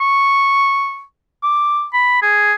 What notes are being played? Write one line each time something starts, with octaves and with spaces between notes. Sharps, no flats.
C#6
D6
B5
G#4